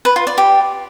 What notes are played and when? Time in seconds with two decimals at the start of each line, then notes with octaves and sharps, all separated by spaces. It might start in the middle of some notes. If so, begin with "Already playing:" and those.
0.05 B4
0.16 F4
0.27 D5
0.38 G4